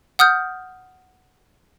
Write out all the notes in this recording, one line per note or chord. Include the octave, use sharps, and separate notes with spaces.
F#5 D#6 F6 G6